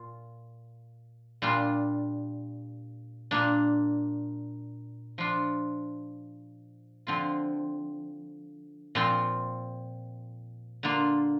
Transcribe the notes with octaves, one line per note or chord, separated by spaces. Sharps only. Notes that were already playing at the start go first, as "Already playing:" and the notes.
Already playing: A#2 F4
A#2 G3 D4 F4
A#2 A#3 D4
F3 D4 F4
D3 F3 C4 F4
A#2 F3 C4 F4
D3 A#3 F4